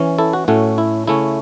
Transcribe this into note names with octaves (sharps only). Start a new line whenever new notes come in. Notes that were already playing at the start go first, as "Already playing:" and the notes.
Already playing: E3 C#4
E4 A4
F#4
A2 A3 C#4 F#4
E4
C#3 A3 C#4 E4